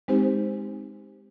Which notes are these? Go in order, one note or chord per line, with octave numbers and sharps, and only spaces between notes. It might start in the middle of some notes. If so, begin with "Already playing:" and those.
G#3 C4 D#4 G4 C5